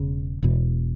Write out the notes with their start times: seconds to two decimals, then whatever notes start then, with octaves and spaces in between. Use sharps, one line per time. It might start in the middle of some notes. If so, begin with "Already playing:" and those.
Already playing: E1 C#3
0.43 E1 E2 B2